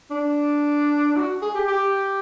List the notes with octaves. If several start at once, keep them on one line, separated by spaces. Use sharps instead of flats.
D4
F#4
G#4
G4
G4